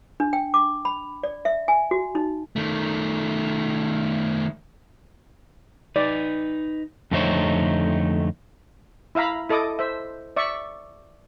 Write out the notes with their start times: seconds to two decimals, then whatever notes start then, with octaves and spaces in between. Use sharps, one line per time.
0.20 D4
0.33 G5
0.54 D6
0.85 B5
1.23 D5
1.45 E5
1.68 G#5
1.91 F#4
2.15 D#4
2.56 D#3 A3
5.96 D#4 B4 D5
7.11 F2 D3 A3 D#4 C5 C#5
9.15 E4 E5 F5 A#5 B5
9.49 E4 A4 D#5 D6 D#6
9.79 C5 E5
10.37 D5 E5 C#6